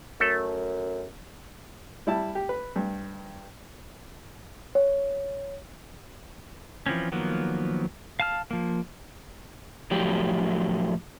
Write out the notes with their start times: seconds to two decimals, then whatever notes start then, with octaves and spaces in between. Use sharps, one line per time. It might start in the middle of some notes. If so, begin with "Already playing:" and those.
0.20 F#2 A3 A4
2.07 G3 E4 A5
2.35 G4
2.49 B4
2.76 G2
4.75 C#5
6.86 E3 F3 C4 C#4
7.12 D#3 F3 F#3 A#3 B3
8.20 F5 A5 F6
8.51 F3 A#3
9.91 A2 F3 F#3 G4